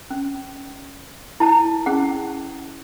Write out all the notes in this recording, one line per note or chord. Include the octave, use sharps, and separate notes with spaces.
C#4
E4 A5
C#4 G#4 F#5